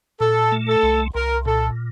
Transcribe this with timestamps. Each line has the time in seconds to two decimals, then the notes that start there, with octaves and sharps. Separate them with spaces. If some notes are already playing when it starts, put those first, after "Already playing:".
0.20 A#2 A4
0.52 A3
0.67 A4
0.83 C2
1.15 C2 A#4
1.45 A#2 A4